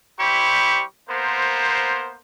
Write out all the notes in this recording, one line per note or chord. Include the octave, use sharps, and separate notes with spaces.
G3 E4 G4 C5 B5 C#6
A#3 B3 A#4 C5